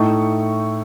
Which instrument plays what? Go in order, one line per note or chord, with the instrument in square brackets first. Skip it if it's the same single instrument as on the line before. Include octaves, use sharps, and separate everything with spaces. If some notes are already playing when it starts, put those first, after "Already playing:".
Already playing: [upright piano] A2 A3 D#4 C#6